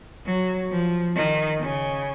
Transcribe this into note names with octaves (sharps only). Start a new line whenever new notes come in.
F#3
F3
D#3
C#3